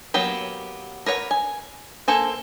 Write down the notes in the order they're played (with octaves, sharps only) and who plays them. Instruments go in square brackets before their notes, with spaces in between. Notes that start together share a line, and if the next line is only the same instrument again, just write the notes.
[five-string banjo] F#3 A#3 B3 G4
A#4 B4 C#5 F#5
G#5
A#3 A4 C5 G#5